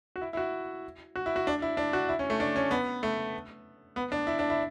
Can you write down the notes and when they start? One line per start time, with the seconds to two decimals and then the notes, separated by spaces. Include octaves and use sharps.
0.16 F#4
0.21 E4
0.33 E4
0.37 F#4
1.16 F#4
1.26 E4
1.36 F#4
1.47 D4
1.62 E4
1.77 D4
1.93 F#4
2.09 E4
2.19 C#4
2.30 A3
2.40 D4
2.56 C#4
2.71 B3
3.03 A3
3.96 B3
4.12 D4
4.27 E4
4.39 D4
4.50 E4